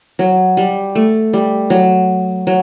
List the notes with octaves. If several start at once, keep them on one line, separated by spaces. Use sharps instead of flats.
F#3
G3
A3
G3
F#3
F#3